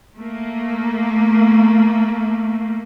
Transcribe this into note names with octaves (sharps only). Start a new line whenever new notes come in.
A3 A#3